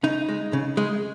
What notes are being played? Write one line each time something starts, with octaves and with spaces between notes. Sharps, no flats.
C#3 D#4
G#3
C#3
G#3